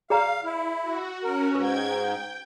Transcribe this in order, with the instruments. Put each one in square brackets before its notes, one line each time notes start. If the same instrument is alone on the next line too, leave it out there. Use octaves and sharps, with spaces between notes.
[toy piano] G#4 D5 A#5 [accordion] F5
[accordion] E4
[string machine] F#4
[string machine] C#4 F#4 [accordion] A#4
[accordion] G#2 [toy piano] B4 [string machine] G5 G#6
[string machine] G5